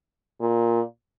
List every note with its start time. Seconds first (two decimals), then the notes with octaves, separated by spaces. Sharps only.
0.41 A#2